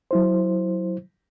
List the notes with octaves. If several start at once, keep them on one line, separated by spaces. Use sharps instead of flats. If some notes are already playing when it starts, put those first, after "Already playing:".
F#3 E4 C5